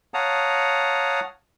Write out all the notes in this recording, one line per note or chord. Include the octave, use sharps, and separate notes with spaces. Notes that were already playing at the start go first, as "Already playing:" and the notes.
C#5 F5 F#5 A5 A#5 D#6